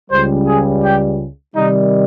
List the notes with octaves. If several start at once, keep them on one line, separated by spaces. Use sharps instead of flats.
C#2 C#3 G3 C5
G#4
G4
C3 D#3 G3 D#4